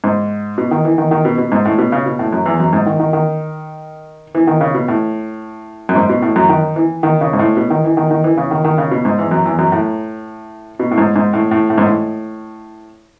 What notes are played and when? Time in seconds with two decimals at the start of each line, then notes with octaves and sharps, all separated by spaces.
0.04 G#2
0.58 B2
0.71 D#3
0.85 E3
0.98 D#3
1.11 D#3
1.25 B2
1.38 B2
1.52 G#2
1.65 A2
1.78 B2
1.92 C#3
2.06 B2
2.19 A2
2.32 F#2
2.46 E2
2.60 F#2
2.73 G#2
2.86 D#3
3.00 D#3
3.13 D#3
4.35 E3
4.47 D#3
4.61 C#3
4.74 B2
4.88 A2
5.89 F#2
5.95 G#2
6.09 B2
6.22 A2
6.36 F#2
6.49 D#3
6.76 E3
7.03 D#3
7.21 C#3
7.33 G#2
7.39 A2
7.57 B2
7.70 D#3
7.84 E3
7.97 D#3
8.11 D#3
8.24 E3
8.37 C#3
8.51 D#3
8.65 D#3
8.78 C#3
8.91 B2
9.05 G#2
9.19 E2
9.31 F#2
9.45 E2
9.59 F#2
9.72 A2
10.79 B2
10.91 A2
10.98 G#2
11.16 G#2
11.33 A2
11.51 A2
11.70 A2
11.78 G#2
11.86 A2